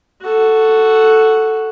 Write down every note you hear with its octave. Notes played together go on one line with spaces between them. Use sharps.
F#4 A4